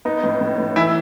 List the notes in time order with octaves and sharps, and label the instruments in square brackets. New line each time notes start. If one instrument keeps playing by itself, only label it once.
[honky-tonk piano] B3 [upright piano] D#4
[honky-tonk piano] A2
A2
A2
[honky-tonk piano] E3 [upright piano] E4